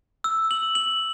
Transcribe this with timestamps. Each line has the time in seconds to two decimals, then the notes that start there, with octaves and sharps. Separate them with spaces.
0.24 E6
0.51 F#7
0.75 F#7